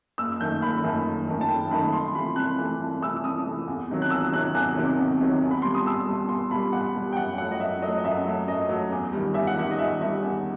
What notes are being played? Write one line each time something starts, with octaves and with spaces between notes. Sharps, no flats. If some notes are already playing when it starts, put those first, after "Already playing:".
F#1 E6
F#2 D#3 A3 G6
F#1 B5
F#2 D#3 A3
F#1
F#2 D#3 A3
A5
F#1 G5
F#2 D#3 A3 B5
C2 C6
C3 E3 A3 B5
C2 F#6
C3 E3 A3
C2
C3 E3 A3 E6
C2 D#6
C3 E3 A3
E2
C3 D#3 F#3
F#6
E2 E6
C3 D#3 F#3 F#6
E2 F#6
C3 D#3 F#3
E2
C3 D#3 F#3
E2
B5
B2 G3 C6
D#6
E2 E6
B2 G3
E2 C6
B2 G3 B5
E2 F#5
B2 G3
G5
F#2 F#5
F#3 A3 F#5
D#5
F#2 E5
F#3 A3 D#5
D#5
F#2 E5
F#3 A3
F#2 D#5
F#3 A3
E2
D#3 G3
E2 E5
F#5
D#3 G3 E5
D#5
E2 E5
D#3 G3 E5
E2